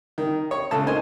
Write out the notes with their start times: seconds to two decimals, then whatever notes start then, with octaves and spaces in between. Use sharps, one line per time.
0.18 D#3
0.51 C#5
0.71 C#2 A4 A5
0.86 A#3 D#4 C5 G#5